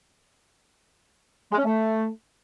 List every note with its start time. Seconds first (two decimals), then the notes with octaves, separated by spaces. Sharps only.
1.52 G#3
1.58 C#4
1.65 A3